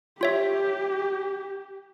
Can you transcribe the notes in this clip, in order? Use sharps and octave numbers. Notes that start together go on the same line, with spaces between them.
F4 G4 C#5 E5